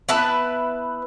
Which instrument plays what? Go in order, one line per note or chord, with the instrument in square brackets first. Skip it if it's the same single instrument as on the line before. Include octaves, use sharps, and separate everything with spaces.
[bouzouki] B3 E4 B4 A5